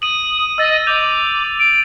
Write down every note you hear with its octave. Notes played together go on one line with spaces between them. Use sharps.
D#6 D#7 F#7
D#5 E6 A6
D6 G6 D#7 F7
D7